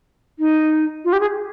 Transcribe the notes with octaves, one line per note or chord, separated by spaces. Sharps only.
D#4
F4
G4
G#4